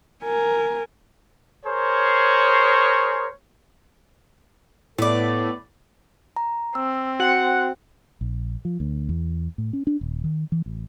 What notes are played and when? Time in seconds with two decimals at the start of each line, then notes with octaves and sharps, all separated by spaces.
0.23 A#4 G#5
1.66 G#4 A#4 C5 C#5
4.98 A2 B3 A4 B4 D5
6.36 A#5
6.75 C4 E6
7.20 F#4 F#5 G5
8.21 A#1
8.65 F3
8.80 D2
9.09 E2
9.58 A2
9.73 C#4
9.87 D4
10.01 D#1
10.24 D#3
10.52 E3
10.66 A1